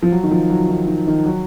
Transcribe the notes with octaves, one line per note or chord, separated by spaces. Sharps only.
F3
F#3
D#3
F3
F#3
D#3
D#3
D#3
F#3